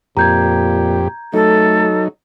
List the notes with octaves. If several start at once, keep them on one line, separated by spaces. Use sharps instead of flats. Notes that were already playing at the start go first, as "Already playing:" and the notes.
F2 A#2 G4 A#5 G6 G#6
F#3 A3 D#4 A4